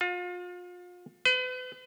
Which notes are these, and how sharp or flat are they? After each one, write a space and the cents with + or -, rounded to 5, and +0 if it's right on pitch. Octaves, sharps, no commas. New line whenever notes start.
F4 +35
B4 +40